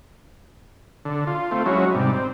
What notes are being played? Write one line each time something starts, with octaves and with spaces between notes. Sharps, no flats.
D3
F4
A3 C4 F4
F#3 G#3 C#4 E4 F#4
G#2 C3 G3
C4